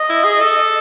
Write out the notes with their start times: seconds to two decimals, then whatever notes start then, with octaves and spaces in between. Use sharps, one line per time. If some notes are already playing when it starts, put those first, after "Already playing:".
Already playing: D#5
0.09 E4
0.24 G#4
0.40 A4